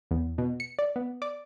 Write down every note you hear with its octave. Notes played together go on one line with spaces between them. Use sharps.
E2
B2
C#7
D5
B3
D5